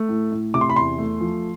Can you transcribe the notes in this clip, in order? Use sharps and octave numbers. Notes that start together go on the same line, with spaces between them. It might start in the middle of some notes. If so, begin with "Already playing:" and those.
Already playing: A3
A2
A2
C3 D6
C6
B5
E2 C6
A3
F3